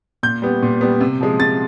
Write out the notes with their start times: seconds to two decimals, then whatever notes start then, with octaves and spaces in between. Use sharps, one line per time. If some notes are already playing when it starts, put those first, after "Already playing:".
0.23 A#2 G6
0.42 G3 B3
0.63 A#2
0.81 G3 B3
1.01 C3
1.21 F3 G#3
1.39 C3 A6